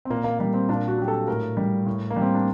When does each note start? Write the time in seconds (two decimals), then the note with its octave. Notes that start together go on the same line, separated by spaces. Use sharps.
0.05 C4
0.10 A#2 A#3
0.24 A#3
0.39 G3 A#3
0.54 C4
0.69 A#2 D4
0.88 F#4
0.98 F#3 G4
1.08 A4
1.28 A2 A#4
1.57 G3
1.86 A2
2.10 A#3
2.16 G3
2.22 C4
2.35 D4